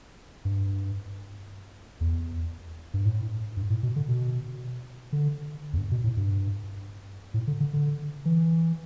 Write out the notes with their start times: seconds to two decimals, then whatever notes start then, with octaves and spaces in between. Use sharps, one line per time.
0.45 G2
2.01 E2
2.94 G2
3.05 A2
3.57 G2
3.70 A2
3.83 B2
3.96 D3
4.09 B2
5.12 D3
5.73 E2
5.77 G2
5.91 B2
6.04 A2
6.17 G2
7.34 A2
7.47 D3
7.60 D3
7.73 D3
8.25 E3